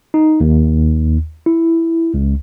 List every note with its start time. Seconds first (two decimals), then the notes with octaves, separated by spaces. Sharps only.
0.14 D#4
0.40 D#2
1.46 E4
2.14 C#2